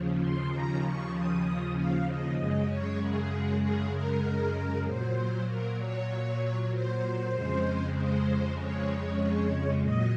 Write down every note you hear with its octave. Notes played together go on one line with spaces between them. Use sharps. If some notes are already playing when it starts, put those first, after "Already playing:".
Already playing: D#2 C#3 F3
C6
A#5
C#6
D#6
F5
D#5
F#2 C#3 G#3 D#5
C#5
G#4
G#4
A#4
A#2 F#3 C5
A#4
C#5
C5
F2 C#3 G#3
C5
C#5
A#2 F#3 D#5